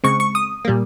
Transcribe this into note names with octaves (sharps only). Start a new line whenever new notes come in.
C#3 G#3 C4 C#6
C#6
D#6
A#2 G3 A#3